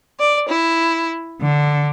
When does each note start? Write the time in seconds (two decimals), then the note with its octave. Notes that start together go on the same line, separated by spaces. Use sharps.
0.20 D5
0.49 E4
1.42 D3